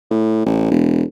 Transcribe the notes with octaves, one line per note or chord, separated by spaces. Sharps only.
A2
A1
E1